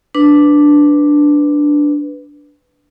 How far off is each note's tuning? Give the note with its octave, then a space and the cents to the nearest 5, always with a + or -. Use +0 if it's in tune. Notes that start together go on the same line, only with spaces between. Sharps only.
D4 +0 B4 +0